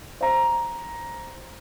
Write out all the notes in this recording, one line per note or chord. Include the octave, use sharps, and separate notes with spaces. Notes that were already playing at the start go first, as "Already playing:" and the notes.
C5 A#5